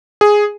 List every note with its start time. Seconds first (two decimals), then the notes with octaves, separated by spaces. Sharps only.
0.21 G#4